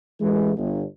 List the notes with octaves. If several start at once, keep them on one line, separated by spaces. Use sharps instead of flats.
A1 E3 G#3
G1